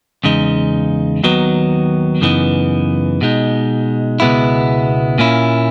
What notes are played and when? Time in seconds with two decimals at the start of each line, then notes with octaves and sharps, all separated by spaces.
0.24 E2 C#3 G#3 D#4
1.24 D#2 D#3 F#3 B3 D#4
2.21 F#2 C#3 E3 B3 D#4
3.21 B2 G#3 D#4
4.20 C#2 B2 G#3 B3 E4
5.18 A#2 A#3 C#4 E4